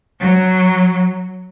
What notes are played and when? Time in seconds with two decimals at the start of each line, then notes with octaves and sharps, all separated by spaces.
0.20 F#3